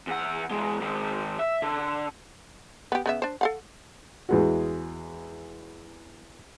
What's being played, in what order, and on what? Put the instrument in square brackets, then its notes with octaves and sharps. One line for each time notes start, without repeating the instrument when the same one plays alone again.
[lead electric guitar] E2 F#5
E2 G#3
D#3 G#3
E5
D3
[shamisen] B3 G4
C#3 B3 E5
D4 C5
A4 F5 F#5
[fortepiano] E2 G#3 F#4